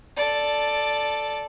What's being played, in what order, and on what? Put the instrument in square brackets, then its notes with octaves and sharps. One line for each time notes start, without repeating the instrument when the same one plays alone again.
[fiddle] A4 D5